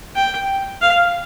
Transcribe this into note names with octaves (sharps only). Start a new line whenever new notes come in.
G5
F5